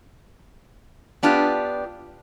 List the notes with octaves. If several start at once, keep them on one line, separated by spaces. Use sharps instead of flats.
B3 D4 F4 G4